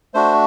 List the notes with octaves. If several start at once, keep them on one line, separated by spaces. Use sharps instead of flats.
A3 D4 F#4 C5